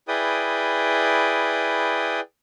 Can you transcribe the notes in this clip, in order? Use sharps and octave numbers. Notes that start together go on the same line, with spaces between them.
E4 G#4 B4 D5 G5 D#6